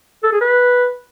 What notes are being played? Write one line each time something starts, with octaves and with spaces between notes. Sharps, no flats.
A4
G#4
B4